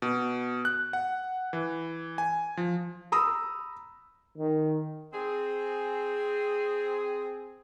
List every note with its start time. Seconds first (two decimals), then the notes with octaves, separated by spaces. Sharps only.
0.02 B2
0.65 F#6
0.93 F#5
1.53 E3
2.18 G#5
2.57 F3
3.12 A#5 B5 D#6 E6
4.37 D#3
5.13 C4 G#4